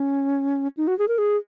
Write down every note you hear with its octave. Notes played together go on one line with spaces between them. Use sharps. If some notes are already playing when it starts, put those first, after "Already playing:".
Already playing: C#4
D#4
F#4
G#4
A#4
G#4